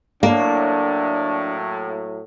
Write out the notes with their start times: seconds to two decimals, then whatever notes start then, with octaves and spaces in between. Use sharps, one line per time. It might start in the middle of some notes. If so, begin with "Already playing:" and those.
0.23 A2 F#3 A#3 D4